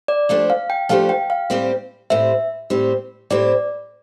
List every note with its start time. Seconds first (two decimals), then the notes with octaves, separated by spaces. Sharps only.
0.08 D5
0.29 F3 A3 D4 G4 C5
0.50 F5
0.70 G5
0.89 F3 A3 D4 G4 C5 F5
1.09 G5
1.30 F5
1.50 A2 G3 C4 G4 C5
2.10 A2 G3 C4 G4 C5 E5
2.70 A2 G3 C4 G4 C5
3.30 A2 G3 C4 G4 C5 D5